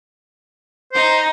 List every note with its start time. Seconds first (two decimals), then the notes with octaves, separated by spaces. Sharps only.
0.93 D#4 C5